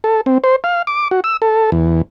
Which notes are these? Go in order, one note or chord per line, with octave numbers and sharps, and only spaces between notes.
A4
C4
C5
F5
D6
F#4
E6
A4
E2